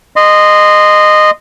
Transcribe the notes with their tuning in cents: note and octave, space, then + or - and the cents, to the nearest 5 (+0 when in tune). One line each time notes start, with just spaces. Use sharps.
D#5 -15 C6 -15